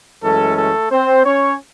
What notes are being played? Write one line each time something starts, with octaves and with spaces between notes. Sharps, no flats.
F#2 E3 G#3 A3 C#4 A4
A3 A4
C4 C5
C#4 C#5